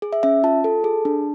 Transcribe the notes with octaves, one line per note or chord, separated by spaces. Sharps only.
G#4
E5
C#4 E5
F4 A5
A4
G#4
D4